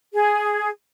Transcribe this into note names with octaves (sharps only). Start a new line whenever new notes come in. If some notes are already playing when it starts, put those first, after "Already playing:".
G#4